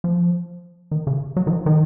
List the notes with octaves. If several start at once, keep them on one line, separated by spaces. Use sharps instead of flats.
F3
D#3
C#3
F#3
D#3
F3
D#3